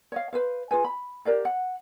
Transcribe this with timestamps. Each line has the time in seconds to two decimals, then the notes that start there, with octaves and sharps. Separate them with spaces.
0.12 C#5 D#5 F5
0.33 B4 C5 F5
0.71 F4 G#4 B4 G#5
0.84 B5
1.25 G4 A#4 D5 F5
1.45 F#5